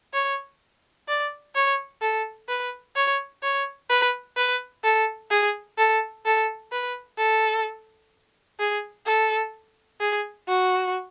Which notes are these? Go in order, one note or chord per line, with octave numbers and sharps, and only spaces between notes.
C#5
D5
C#5
A4
B4
C#5
C#5
B4
B4
A4
G#4
A4
A4
B4
A4
G#4
A4
G#4
F#4